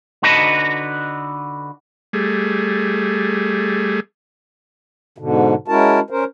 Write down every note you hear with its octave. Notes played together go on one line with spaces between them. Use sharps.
D3 D#4 F#4 B4 D#5 A5
G3 A3 G#4
G#2 B2 D3
G#3 C#4 E4 F#4 A#4 A5
C#4 A#4 C5